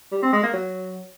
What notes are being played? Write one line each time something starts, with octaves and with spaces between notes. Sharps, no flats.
G3
C4
G#3
A#3
F#3